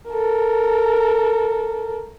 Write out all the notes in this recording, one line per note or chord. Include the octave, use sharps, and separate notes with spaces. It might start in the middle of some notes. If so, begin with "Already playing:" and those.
A4 A#4